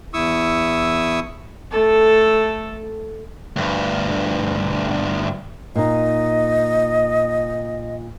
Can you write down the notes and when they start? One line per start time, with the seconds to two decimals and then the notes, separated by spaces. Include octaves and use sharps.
0.14 E2 E4 C#6 D#6 E6
1.71 A3 A4
3.56 D2 G2
5.76 A#2 D#4 D#5